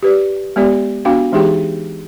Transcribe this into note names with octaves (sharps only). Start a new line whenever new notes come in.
G4 B4 D5
G#3 B3 G4 D5
B3 D4 F#4 F5 G5
E3 G#3 D#4 G4 G#4 G5